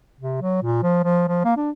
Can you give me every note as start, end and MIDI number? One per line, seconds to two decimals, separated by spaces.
0.20 0.40 48
0.42 0.61 54
0.63 0.79 46
0.83 1.03 53
1.04 1.27 53
1.28 1.44 53
1.45 1.56 58
1.57 1.71 62